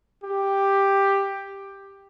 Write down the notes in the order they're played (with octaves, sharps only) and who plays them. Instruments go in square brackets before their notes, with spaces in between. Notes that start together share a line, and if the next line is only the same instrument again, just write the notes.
[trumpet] G4